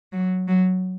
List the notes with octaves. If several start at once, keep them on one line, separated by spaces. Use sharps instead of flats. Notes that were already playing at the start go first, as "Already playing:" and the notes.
F#3
F#3